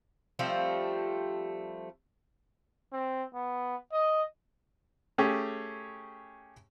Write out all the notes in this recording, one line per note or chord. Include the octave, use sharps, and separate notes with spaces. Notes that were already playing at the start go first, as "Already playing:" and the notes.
F3 G3 A3 C4
C4
B3
D#5
A3 C#4 G4 G#4